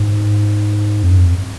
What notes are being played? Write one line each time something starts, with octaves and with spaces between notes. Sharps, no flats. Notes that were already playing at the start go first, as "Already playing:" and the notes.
Already playing: G#2
F2
F#2
F2